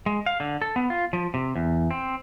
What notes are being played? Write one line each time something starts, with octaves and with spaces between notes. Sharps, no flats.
G#3
F5
D3
A4
B3
F4
F3
C3
E2
C4